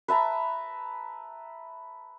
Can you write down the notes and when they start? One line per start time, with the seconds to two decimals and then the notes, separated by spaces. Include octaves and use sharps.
0.08 B4 E5 A5 A#5